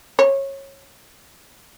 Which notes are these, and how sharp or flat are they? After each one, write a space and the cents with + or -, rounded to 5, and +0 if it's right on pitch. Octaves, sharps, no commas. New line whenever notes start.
C#5 -20